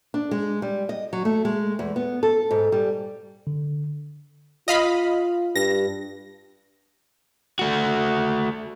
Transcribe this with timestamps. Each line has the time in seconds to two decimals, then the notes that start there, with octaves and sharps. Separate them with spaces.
0.14 D4
0.31 G#3
0.62 G3
0.89 D#5
1.13 F#3
1.25 A3
1.45 G#3
1.79 E2
1.96 B3
2.23 A4
2.51 G#2
2.72 G3
3.47 D3
4.68 F4 D#5 F5 B5
5.56 G2 A#6
7.59 A3 F#4